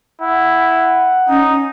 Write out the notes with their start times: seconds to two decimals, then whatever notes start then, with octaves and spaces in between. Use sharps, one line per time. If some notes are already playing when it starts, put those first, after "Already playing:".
0.22 E4 F#5
1.29 C#4 D#4